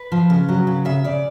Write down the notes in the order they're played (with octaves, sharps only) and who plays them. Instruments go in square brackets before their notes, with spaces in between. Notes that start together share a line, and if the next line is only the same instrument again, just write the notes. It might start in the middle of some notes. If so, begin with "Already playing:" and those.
Already playing: [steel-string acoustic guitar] B4
F3
C#3
F#3
C#3
C#3 E5
C#3 D5